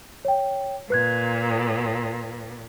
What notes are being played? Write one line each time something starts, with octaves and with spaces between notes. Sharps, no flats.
C#5 G5
A#2 B4 F#6 G#6